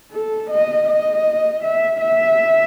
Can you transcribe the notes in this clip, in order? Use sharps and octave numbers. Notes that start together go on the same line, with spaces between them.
A4
D#5
D#5
E5
E5